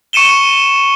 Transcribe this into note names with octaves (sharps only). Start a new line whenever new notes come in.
C#6 C#7 D#7 E7 G7